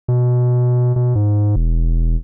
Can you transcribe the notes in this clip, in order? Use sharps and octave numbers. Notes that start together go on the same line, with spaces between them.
B2
B2
G#2
E1